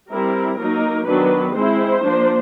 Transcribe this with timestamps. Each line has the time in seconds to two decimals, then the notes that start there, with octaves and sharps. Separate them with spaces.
0.11 G3 C4 E4 A#4
0.59 F#3 A#3 D#4 A#4
1.07 D#3 F#3 B3 D4 B4
1.55 G#3 C4 E4 C5
2.03 F3 A#3 D4